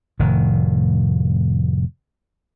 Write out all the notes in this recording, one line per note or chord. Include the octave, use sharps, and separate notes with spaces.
F1 A2 D#3